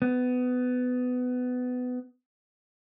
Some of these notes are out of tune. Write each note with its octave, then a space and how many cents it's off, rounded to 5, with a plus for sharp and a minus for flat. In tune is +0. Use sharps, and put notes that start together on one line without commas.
B3 +20